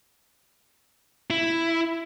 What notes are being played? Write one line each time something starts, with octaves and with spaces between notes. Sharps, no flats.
E4